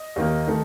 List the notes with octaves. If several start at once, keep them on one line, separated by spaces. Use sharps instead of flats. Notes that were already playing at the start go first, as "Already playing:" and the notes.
Already playing: D#5
D#2 D#3 A#3
D#3 A3